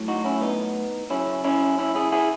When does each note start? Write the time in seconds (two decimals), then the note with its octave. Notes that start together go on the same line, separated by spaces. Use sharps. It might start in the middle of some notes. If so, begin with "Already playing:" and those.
Already playing: A2 F#3
0.08 D#4 F#4
0.25 C#4 E4
0.41 B3 D#4
1.10 C#3 F#3 C#4 E4
1.44 C#4 E4
1.79 C#4 E4
1.95 E4 G#4
2.12 E4 G#4